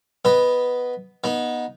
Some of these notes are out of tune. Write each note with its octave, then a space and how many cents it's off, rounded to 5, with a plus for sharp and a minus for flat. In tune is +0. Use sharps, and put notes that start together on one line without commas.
B3 +0 B4 +0 D#5 +0
B3 -20 D#4 +0